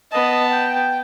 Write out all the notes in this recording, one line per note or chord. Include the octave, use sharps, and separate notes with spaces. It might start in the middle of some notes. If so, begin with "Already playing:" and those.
B3 D#5 A5
G5